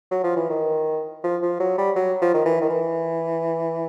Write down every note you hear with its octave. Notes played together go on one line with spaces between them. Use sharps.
F#3
F3
E3
D#3
F3
F3
F#3
G3
F#3
F3
D#3
E3
D#3
E3